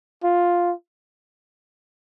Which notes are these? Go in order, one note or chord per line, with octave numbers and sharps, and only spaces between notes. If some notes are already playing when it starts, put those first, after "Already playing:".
F4